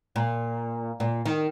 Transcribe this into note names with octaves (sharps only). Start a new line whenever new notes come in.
A#2
A#2
D#3